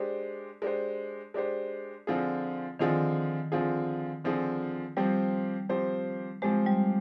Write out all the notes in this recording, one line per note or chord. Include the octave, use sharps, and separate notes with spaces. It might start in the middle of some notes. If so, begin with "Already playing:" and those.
Already playing: G#3 D4 G4 C5
G#3 D4 G4 C5
G#3 D4 G4 C5
D3 F3 C4 F4 G#4
D3 D#3 F3 C4 F4 G#4
D3 F3 C4 F4 G#4
D3 F3 C4 F4 G#4
F3 G3 C4 G4 C5
F3 C4 G4 C5
F3 G#3 C4 G4 C5
G3